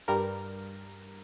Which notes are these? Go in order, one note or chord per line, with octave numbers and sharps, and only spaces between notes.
G2 G3 A#4